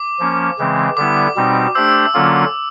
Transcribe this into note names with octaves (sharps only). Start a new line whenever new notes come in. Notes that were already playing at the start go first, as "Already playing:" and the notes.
Already playing: D6
F3 A#3 C#4
C#3 E3 G#3 C4
D3 G3 B3 E4 D6
B2 G3 C4 D#4
A3 D4 G4 C5 E6
D3 F#3 A#3 C#4 F4